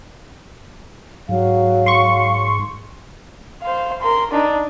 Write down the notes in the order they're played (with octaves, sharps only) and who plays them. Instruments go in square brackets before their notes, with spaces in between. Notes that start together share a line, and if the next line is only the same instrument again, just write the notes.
[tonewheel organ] G#2 [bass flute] F#3 [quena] F5
[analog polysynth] C6 C#6
[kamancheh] C5 F5
A#4 C6
D4 D#4